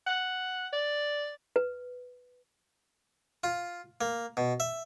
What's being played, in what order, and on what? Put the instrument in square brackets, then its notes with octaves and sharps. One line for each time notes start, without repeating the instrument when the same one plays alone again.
[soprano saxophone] F#5
D5
[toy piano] B4
[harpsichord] F4
A#3
B2
E5